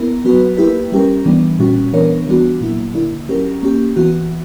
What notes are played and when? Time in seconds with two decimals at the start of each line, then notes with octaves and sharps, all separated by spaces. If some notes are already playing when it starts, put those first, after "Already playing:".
Already playing: B3 E4 A#4
0.25 F#3 B3 F#4 B4
0.57 A#3 E4 G4 B4
0.92 G3 C#4 G4 A#4
1.26 E3 G3 B3 D4
1.59 A#2 G3 C#4 F#4
1.93 E3 B3 D4 A#4 C#5
2.26 E3 G3 B3 D4 F#4
2.61 A#2 F#3 A#3 E4
2.94 D3 A#3 E4
3.28 F#3 C#4 G4 A#4
3.63 A#3 C#4 G4
3.96 E3 B3 F#4